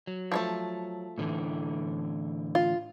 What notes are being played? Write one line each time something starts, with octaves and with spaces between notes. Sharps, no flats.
F#3
F3 G#3 A3
A2 D3 E3
F4